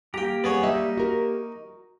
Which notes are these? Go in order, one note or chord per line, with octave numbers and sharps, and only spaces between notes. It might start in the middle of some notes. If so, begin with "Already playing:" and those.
A#3 G4 G5 A#5
B3 G#4 C#5
G3 D#4 E5
F#4 A#4